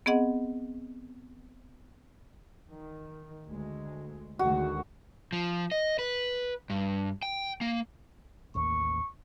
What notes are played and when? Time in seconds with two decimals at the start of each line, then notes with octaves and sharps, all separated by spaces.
0.06 B3 C4 G#4 D#5 F#5
2.69 D#3
3.47 D2 G#3
4.39 D2 D#3 G#3 F#4
5.32 F3
5.72 D#5
5.99 B4
6.70 G2
7.23 G5
7.61 A#3
8.55 A1 D#2 A#3 C#6